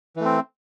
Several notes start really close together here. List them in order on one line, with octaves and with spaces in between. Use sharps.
E3 A3 C4